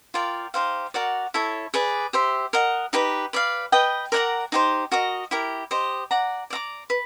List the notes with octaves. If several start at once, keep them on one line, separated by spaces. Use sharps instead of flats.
F4 A#4 D5 G5
D#4 G4 C5 F5
F#4 A#4 D5 F#5
E4 A4 C#5
G#4 B4 D5
G4 C5 E5
A#4 D#5 F#5
D#4 G4 B4
B4 D5 F5
B4 D#5 G5
A#4 D5 F#5 A#5
D#4 G4 C5
F#4 A#4 D#5
E4 G4 A#4
G4 C5 D#5
D5 F#5 A#5
D5 F5 A#5 D6
B4